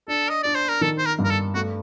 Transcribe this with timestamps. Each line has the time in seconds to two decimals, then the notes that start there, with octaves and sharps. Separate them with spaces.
0.08 D4 A4
0.29 D#5
0.43 D4 D5
0.55 C5
0.69 A#4
0.81 D#3 A4
0.98 C5
1.06 A#4
1.19 G2
1.24 A#4
1.30 A4
1.55 A3 F#4